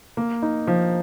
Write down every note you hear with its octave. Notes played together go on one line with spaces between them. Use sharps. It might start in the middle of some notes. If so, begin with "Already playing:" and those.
A#3
D#4
F3